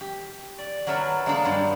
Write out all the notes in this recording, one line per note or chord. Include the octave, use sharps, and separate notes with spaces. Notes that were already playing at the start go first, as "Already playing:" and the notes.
G4
D5
F#3 B3 A#4 E5 F#5 A5
G#3 A#3 D4 D#4 A4 D5
G2 B3